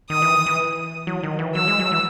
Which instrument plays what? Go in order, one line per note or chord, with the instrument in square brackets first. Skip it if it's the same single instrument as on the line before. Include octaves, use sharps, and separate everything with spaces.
[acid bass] D#3 [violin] D#6
[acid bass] E3
E3
F#3
D#3
E3
[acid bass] F#3 [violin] E6
[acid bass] G#3
F#3
E3